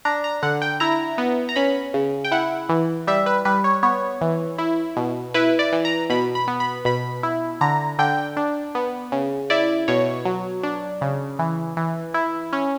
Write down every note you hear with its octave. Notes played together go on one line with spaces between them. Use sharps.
D4 A#5
A#5
D3 F#5
G5
E4 A#5
B3
A#5
C#4 B5
C#3
G5
E4 F#5
E3
G3 E5
B4
G3 B4
C#5
B3 C#5
E3
E4
B2
E4 B4
D5
E3
A#5
B2 B5
B5
B3
B5
B2 B5
E4
D3 A#5
D3 G5
D4
B3
C#3
E4 D5
B2 C#5
F#3
D4
C#3
E3
E3
E4
C#4